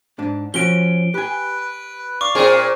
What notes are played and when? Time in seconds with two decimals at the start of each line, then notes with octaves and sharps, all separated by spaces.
0.19 G#2 D4
0.54 F3 C#4 F#4 D7 G7
1.14 G4 B4 G#5
2.21 D5 F5 C#6 D6
2.35 A#2 C4 G#4